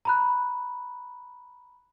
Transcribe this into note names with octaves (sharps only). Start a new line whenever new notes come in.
A#5 B5 F#6